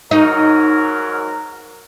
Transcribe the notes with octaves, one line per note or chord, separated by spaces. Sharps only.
G#2 F#3 D#4 A#4